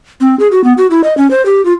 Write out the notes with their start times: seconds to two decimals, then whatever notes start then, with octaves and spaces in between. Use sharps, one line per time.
0.21 C4
0.40 G#4
0.52 F#4
0.64 B3
0.78 F#4
0.91 E4
1.04 D#5
1.18 C#4
1.31 C5
1.46 G4
1.65 F4